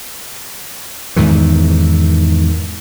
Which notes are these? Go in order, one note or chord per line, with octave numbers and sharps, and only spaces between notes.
E2 G#2 D#3 E3